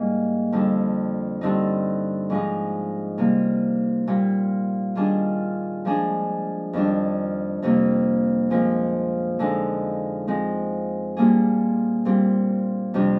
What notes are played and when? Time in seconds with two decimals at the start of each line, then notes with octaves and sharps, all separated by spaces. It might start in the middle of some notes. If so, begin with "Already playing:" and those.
Already playing: G#2 G3 A#3
0.52 F2 D3 G3 D4
1.41 G2 D3 G3 C4 D#4
2.30 G#2 F3 G#3 D#4
3.18 C3 G3 A#3
4.07 A#2 G3 A#3
4.95 D#3 G3 D4 F4 G#4
5.85 F3 G#3 D4 G#4
6.73 F2 D#3 G3 D4
7.62 F2 C3 G3 A#3
8.50 A#2 F3 G#3 C4
9.39 D3 F3 G#3 D#4
10.27 F3 G#3 C4
11.17 A#2 G3 A#3 D4 G#4
12.05 A#2 G3 C4
12.94 F2 C3 G3 D4 G4